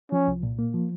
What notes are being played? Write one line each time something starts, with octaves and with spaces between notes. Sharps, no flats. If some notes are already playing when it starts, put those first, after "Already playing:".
F3 C#4
C2
A#2
A#3
F3